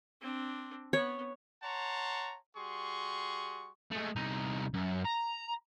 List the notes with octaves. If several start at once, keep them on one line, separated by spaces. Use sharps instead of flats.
C4 D4
B3 C#5
C#5 F#5 A5 A#5 C6
G3 F#4 G#4 C6 C#6
G#3 A3
C2 D#4
F#2
A#5